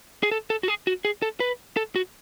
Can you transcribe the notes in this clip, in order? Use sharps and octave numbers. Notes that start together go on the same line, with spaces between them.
G#4
A4
A4
F#4
G#4
F#4
G#4
A4
B4
A4
F#4